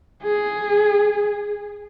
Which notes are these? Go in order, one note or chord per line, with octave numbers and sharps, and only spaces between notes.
G#4